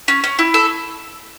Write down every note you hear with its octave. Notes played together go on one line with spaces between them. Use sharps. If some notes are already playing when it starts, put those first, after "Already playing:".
C#4
C#4
E4
A4